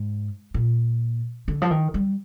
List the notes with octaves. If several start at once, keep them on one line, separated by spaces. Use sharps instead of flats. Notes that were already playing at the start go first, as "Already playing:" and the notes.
Already playing: G#2
A#2
D3
F3
D#3
G3